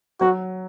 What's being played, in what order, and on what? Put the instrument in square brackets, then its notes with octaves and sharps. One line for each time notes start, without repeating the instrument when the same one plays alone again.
[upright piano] F#3 [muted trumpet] F#4